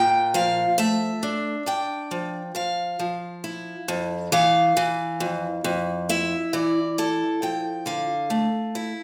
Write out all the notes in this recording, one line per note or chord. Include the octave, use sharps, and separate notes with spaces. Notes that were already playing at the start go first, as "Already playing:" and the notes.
Already playing: A#2 G5
F3 F5
A3 E5
D4
D4 G5
F3
F3 F5
F3
E4
F2
E3 F5
E3
F2
F2
E4 E5
E3 D5
E4 A4
F3 G5
D3 F5
A3
E4